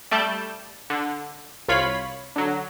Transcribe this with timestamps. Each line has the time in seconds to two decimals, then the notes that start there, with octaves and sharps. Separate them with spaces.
0.11 G3 A3 D5 A5 G6
0.90 D3
1.68 C2 F4 C#5 B5 B6
2.36 D3 F#3